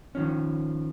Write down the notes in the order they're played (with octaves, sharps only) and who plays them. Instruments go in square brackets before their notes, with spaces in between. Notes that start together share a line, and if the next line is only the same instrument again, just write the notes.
[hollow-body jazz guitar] D#3 F3 C#4